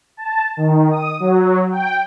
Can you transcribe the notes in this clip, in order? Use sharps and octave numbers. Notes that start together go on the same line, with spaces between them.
A5
D#3
D#6
F#3
G5